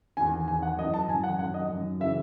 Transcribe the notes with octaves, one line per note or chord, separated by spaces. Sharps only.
E2 D#3 G#5
E2 D#3 G#5
F#5
F#2 E3 D#5
A5
F#2 E3 G#5
F#5
F#2 D#3 F#5
D#5
F#2 D#3
C#3 E3 E5